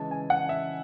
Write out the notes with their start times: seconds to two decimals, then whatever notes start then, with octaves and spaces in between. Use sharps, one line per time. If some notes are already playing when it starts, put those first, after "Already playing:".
Already playing: C#3 E3 G#3 C#4 G#4 A5
0.11 G#5
0.30 F#5
0.49 E5